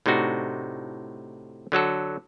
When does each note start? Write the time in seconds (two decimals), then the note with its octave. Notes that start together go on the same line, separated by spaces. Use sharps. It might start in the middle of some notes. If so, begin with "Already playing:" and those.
0.06 A2 C3 D4 D#4 F#4
1.72 D3 F#3 F#4 A4